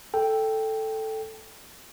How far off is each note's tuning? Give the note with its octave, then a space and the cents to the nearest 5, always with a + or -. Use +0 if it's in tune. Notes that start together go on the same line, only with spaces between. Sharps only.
A4 +0 G5 +0